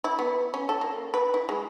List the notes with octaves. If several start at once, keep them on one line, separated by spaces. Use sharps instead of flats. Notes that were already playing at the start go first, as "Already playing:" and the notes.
E4
B3
C#4
A4
A#3
B4
E4
G#3